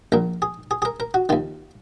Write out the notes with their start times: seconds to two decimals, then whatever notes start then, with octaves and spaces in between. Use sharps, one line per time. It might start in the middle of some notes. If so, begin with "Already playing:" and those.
0.12 A#1 A#2 A#4
0.42 G#4
0.71 G#4
0.82 G#4
0.85 A#4
1.00 A#4
1.14 F#4
1.29 D#2 D#3 F4